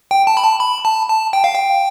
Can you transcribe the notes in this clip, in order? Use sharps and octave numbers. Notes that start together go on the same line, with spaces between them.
G5
A5
B5
A5
B5
A5
A5
G5
F5
G5